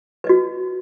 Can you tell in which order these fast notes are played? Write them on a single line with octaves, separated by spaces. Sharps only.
B4 D#5 F#4